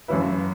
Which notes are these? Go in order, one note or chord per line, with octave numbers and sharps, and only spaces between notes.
F#2 E3 C#4 E4 B4